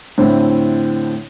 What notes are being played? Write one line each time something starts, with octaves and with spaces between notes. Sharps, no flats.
A2 D3 C4 E4